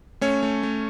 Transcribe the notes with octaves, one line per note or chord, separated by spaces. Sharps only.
A3 C#4 C#5
A3
A3